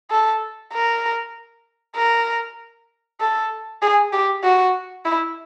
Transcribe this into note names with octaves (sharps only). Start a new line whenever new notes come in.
A4
A#4
A#4
A4
G#4
G4
F#4
E4